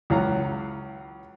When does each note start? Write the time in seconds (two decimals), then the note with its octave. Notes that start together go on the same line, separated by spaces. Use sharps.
0.10 C#2 E3 F#3 F5 A#5